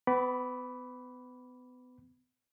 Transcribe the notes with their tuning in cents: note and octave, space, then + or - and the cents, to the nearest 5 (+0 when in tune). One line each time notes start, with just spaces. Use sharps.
B3 +30 B5 +0 D6 -20